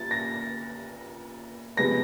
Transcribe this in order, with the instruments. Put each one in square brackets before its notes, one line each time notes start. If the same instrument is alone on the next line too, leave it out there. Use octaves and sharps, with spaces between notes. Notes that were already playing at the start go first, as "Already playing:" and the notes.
Already playing: [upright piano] A#2 A6
A#6
C3 F3 G#3 B3 A#6